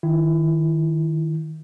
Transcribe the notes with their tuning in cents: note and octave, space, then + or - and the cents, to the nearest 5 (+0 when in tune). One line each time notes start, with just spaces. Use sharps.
D#3 +5 E4 +30